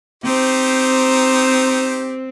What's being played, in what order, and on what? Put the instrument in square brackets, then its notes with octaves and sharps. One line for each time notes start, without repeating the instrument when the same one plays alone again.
[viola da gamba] C4 [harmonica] D#4 G4 C5